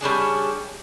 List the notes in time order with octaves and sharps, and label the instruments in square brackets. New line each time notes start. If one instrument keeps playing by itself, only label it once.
[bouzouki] G3 C#4 D4 G#4